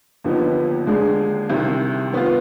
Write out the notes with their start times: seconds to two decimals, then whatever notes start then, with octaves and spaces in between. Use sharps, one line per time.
0.24 D#2 D3 F3 B3 D#4
0.86 D#2 D3 G#3 D4 G#4
1.50 C2 C3 D#3
2.12 D#3 B3 F4